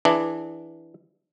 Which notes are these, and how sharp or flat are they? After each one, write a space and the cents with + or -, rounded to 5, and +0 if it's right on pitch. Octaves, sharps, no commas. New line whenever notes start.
E3 +0 D4 +0 G#4 +30